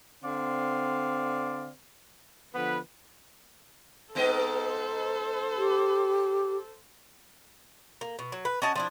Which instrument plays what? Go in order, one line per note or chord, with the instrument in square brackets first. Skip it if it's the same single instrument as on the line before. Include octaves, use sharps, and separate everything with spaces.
[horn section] D3 C4 D5 F5 C6
D3 F3 B3 B4
[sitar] G#2 B3 D#5 [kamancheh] A4 C5
[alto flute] G4
[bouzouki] A#3
B2
F#3
B4
C#4 F#4 D#5 A5
F3 D4 E4